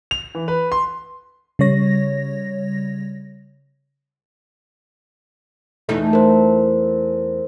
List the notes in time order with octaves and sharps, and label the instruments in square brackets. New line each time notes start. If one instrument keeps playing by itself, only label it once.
[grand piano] F7
E3
B4
C6
[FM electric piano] C#3 G3 C#5 A#6
[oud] E2 A3 D#4
[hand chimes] A#4 C5